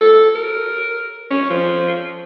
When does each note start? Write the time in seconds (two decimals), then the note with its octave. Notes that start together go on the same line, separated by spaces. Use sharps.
0.01 A4
0.35 A#4
1.30 C#4
1.50 F3